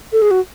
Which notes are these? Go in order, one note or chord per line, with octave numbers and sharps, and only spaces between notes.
A4
G#4
F#4